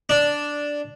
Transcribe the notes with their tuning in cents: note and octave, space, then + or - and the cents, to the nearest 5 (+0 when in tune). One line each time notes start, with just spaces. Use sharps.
D4 -5